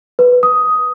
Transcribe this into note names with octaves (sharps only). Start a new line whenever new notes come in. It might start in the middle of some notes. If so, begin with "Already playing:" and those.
B4
D#6